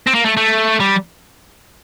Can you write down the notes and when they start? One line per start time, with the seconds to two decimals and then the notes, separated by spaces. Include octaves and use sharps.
0.07 C4
0.14 A#3
0.25 A3
0.37 A3
0.80 G3